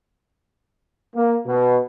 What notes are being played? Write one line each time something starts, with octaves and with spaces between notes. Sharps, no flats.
A#3
B2